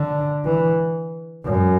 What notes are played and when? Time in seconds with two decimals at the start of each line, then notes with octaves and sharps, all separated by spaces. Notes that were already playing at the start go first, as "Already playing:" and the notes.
Already playing: D3
0.45 E3
1.45 F#2